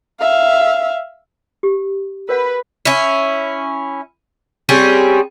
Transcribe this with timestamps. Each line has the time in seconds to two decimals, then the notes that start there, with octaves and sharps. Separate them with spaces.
0.20 E5 F5
1.63 G4
2.29 A#4 B4 C#5 F#5
2.85 C#4 E4
4.69 G3 C4 C#4 G#4